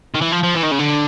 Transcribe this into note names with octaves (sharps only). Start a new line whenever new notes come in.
D#3
E3
F3
F3
E3
D#3
C#3
D3